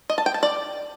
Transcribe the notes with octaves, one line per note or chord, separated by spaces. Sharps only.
D#5
A5
G5
A5
D5